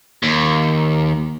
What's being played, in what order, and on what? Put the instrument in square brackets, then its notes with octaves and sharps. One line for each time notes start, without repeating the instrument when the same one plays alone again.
[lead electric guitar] D#2